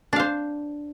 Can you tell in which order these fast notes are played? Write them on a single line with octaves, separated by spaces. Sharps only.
D4 F5 C5